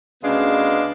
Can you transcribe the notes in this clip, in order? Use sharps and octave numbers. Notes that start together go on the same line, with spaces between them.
D2 C#3 G#3 B3 D4 F5